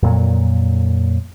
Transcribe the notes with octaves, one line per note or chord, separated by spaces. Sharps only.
F2 A#2 F#3